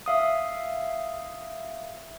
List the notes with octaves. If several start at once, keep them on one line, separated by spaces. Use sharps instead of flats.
E5 F5 D#6